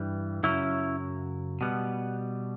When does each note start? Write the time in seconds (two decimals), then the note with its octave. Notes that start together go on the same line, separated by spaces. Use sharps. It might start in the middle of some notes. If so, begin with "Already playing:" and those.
Already playing: G2 E3 G3
0.43 F#2 C#3 F#3 C#4 E4
1.61 B2 G3 B3